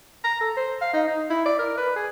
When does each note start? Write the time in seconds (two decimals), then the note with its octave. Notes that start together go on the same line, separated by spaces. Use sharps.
0.24 A#5
0.41 A4
0.57 C5
0.82 F5
0.94 D#4
1.07 D#4
1.30 E4
1.46 D5
1.59 A#4
1.77 B4
1.96 G#4